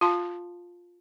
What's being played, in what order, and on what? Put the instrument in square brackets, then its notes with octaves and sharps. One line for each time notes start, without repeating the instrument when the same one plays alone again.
[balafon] F4 F5 A5 C6